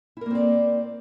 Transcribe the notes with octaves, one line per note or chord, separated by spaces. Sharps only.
A#3 C4 E4 A#4 D5